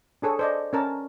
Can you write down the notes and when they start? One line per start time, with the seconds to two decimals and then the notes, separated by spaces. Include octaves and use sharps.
0.22 D4 G#4 A4 C#5
0.39 C5 D5 D#5
0.73 C#4 A#4 A5